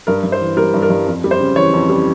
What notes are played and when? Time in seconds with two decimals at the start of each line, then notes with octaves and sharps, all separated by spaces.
0.07 G2 A#4
0.24 G2
0.32 C5
0.41 E3
0.57 G3 A#4
0.74 G2
0.82 A#4
0.90 G2
1.06 F2
1.24 G3
1.31 C5
1.40 C#3
1.56 E3 C#5
1.74 F2
1.89 G3